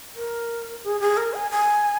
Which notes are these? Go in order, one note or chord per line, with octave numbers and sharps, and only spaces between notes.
A#4
G#4
G#4
A#4
G#5
G#5